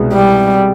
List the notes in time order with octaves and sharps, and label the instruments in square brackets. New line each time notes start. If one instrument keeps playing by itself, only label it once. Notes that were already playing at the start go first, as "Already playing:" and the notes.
Already playing: [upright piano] C2 B2 G#3 B3
[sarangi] G3